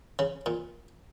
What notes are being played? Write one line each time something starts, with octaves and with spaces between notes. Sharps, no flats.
C#3
A#2